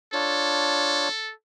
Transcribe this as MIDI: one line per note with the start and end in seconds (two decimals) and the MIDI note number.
0.13 1.08 62
0.13 1.08 65
0.13 1.32 69
0.13 1.08 73